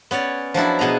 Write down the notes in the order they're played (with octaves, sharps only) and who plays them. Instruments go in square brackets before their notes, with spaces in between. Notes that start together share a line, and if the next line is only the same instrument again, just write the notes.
[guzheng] B3 C#4 C#5 D5
F3 F#3 D4 E4
B2 B3 G#4 A#5